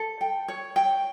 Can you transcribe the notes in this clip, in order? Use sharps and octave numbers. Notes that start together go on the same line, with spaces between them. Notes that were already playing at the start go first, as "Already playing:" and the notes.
Already playing: A4
G5
C#5
G5